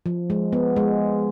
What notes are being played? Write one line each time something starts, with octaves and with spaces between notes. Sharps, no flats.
F3
G#3
B3
G#3